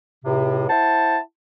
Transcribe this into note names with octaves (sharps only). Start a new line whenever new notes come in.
C#2 A2 C3
E4 C5 F#5 A5